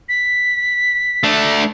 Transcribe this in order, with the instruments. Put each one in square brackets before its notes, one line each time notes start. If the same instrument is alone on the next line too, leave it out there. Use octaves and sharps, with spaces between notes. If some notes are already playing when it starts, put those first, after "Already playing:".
[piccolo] B6
[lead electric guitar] A3 D4